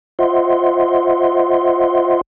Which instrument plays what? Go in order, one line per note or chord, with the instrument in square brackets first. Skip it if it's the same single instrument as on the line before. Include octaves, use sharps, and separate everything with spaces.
[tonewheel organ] F4 C5 D#5 E5 F#5 C6